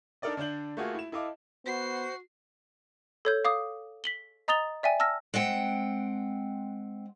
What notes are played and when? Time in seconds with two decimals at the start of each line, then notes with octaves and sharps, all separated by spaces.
0.22 D4 D#4 A4 A#4 D5 D#5
0.37 D3 D4 D5 G6 F#7
0.77 A3 A#3 F4 F#4 G#4
0.94 E4 E7
1.12 E4 A4 D#5 F5 D6
1.66 B3 F#4 C5 C7
3.25 A4 C#5 G6
3.45 F5 D6 D#6
4.04 B6 F#7 G7
4.48 D#5 A#5 D#6 A6 F7 G7
4.83 D5 E5 G5 G#5
5.00 A5 E6 F6 A#6
5.34 G#3 C4 F#5 G5